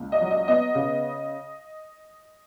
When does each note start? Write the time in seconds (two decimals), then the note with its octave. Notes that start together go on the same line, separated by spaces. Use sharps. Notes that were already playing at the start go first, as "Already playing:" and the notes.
Already playing: C#2
0.12 D#5
0.21 F#3
0.31 D#5
0.48 B3 D#5
0.75 C#3